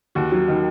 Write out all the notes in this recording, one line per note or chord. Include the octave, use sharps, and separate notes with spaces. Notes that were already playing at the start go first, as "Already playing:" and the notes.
D#2 F#4
F#3
D#3